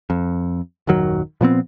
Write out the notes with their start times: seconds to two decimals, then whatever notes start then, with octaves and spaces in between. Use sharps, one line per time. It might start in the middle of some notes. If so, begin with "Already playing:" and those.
0.10 F2
0.87 D#1 F#2 D#3 F#3
1.41 A#2 F3 B3 C4